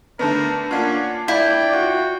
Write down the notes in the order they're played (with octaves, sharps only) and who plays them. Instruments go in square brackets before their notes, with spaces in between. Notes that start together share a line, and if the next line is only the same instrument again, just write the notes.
[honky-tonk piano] D3 A3 B3 [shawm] A#4
[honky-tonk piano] A#3 D4 F4 [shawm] C#4 [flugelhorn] F#5
[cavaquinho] E4 [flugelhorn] D5 [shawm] G5
[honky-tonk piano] F4 [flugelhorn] F#4